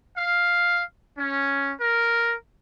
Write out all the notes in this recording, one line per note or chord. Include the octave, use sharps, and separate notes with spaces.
F5
C#4
A#4